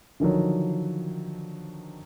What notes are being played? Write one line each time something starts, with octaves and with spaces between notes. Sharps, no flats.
D3 D#3 F3 F#3